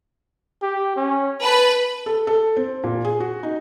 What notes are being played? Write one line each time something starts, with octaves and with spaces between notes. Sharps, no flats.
G4
C#4
B4 A5
A4
A4
C4
A#2
G#4
F#4
D#4